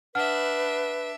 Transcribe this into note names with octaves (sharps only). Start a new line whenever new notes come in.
D4 B4 E5 F#5 F6